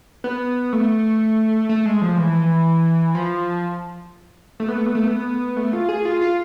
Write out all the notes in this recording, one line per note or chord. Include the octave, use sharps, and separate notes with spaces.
B3
A3
A3
G#3
F3
E3
F3
A3
B3
A3
B3
A3
B3
A3
F4
G#4
F4
F4